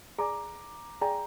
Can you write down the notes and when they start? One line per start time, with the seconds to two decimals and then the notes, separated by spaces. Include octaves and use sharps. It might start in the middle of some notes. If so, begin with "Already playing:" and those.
0.18 G#4 D5 G#5 A#5 D6
1.01 G#4 D5 G5 G#5 A#5